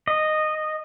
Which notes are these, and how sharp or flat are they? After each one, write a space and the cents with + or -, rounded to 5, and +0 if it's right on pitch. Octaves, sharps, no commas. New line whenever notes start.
D#5 -10